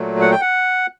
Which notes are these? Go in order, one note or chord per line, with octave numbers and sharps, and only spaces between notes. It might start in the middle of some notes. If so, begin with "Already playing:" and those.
Already playing: A#2 F#3 A3
F#5
G5
F#5